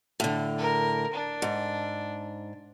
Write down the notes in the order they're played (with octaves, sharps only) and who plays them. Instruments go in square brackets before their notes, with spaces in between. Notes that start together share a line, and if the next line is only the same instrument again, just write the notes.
[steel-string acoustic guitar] A2 D3
[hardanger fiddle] A#4
D4
[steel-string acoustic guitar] G#2